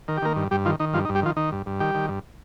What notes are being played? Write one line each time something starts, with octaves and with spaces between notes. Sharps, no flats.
D#3 A#4
G4
D#3 A#3 A#4
G2
G2 G3 G4
D#3 F3 F4
D#3 D#4
G2 F3 F4
D#4
G2
G3 G4
D#3 F3 F4
D#3 D#4
G2
G2
D#3 G3 G4
D#3
G2